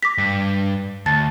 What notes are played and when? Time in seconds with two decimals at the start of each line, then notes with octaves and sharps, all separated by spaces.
0.03 D6 A#6 B6
0.18 G2
1.06 D2 A5 A6